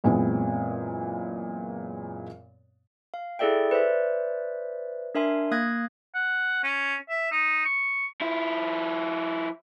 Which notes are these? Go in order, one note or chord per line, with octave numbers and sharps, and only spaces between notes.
F#2 A#2 E3 G#3 B3 C4
F5
E4 G#4 A4 D5 E5 G5
B4 C5 D5 E5
D4 A#4 E5 G#5 C6
A#3 F5 D#6 F#6 G#6 A#6
F#5
C#4
E5
D#4
C#6
F3 E4